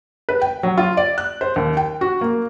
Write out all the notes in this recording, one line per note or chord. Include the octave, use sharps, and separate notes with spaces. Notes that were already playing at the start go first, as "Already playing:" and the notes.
B4
G5
F#3
F4
D5
F#6
C5
D#2
G5
F#4
A#3